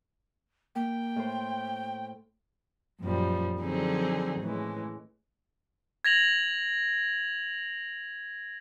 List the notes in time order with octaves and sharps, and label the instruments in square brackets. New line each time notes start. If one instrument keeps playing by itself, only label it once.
[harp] A#3 [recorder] G5
[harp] A2 C5
[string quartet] F#2 A#2 F3 G3
D3 F3 F#3 C4 D#4 G#4
A2 C#3 E3 G#3
[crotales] G#6 A#6 F7 F#7